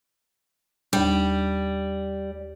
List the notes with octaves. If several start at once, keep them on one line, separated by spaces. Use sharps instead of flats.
D#2 G3 D4